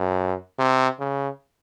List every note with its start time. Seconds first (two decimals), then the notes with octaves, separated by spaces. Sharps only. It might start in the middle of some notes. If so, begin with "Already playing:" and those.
Already playing: F#2
0.59 C3
1.00 C#3